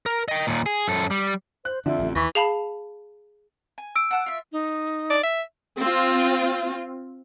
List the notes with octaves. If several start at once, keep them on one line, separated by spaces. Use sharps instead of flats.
A#4
D#5 G5
D#2 A#2
G#4
F#2 A4
G3
C5 F#6
F2 D3 F3 D4 F4 E5
A1
D#2 E3 C#6 A#6 B6
G#4 F5 A5 B5
G#5
E6 D7
F#5 A5 F#6
F4 E5
D#4
D5
E5
C4 F4